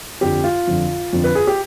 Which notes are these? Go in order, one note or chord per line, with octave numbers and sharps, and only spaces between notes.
F2 D3 F3 G4
F4
F2 D3 F3
F2 D3 F3
B4
G#4
G4